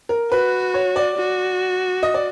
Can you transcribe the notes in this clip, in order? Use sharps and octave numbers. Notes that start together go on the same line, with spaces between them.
A#4
F#4 B4
C#5
D5
F#4
D#5
D5